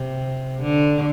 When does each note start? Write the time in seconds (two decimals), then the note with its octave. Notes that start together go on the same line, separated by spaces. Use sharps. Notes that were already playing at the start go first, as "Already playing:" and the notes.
Already playing: C3
0.62 D3